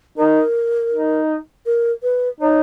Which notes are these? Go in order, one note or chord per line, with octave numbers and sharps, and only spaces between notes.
D#4 A#4
D#4
A#4
B4
D#4 C#5